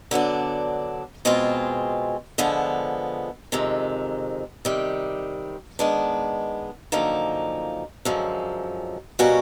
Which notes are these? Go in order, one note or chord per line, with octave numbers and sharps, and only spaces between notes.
D3 F#3 B3 D4
B2 G#3 C4 F4 G#4
D3 F3 G#3 B3
F2 C3 D#3 G#3
C3 D#3 G3
D#3 G#3 B3 D4
F#2 D3 F3 A#3 D#4
F#2 D3 F3 G#3
B2 G3 A#3 C#4 F#4